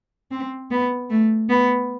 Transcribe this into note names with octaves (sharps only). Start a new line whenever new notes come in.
C4
B3
A3
B3